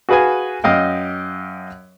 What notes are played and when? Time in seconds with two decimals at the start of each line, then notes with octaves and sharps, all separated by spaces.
0.09 F#4 G#4 B4 F5 G#5
0.64 F#2 D#5 F5 G5